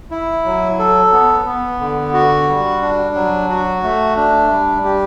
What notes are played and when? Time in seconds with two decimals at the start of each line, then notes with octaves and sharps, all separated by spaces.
0.11 E4
0.45 F#3
0.79 A4
1.12 B3
1.46 B3
1.80 D3
2.14 F#4
2.48 G3
2.82 D4
3.15 F#3
3.50 F#4
3.83 A3
4.17 D4
4.50 G3
4.84 G4